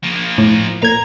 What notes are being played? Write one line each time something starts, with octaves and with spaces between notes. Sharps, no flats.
F3 A#3
A2
A#2 A#5 G#6